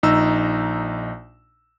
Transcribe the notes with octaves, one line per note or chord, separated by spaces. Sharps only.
A#1 D#4 A#5 E6